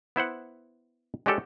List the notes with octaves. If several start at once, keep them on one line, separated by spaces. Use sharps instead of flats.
B3 E4 C5 F#5
G#3 D4 F#4 G4 A4 C#5